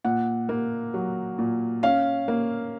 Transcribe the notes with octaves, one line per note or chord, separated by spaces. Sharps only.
A#2 F#5
A#3
F#3
A#2
C#4 F5
A#3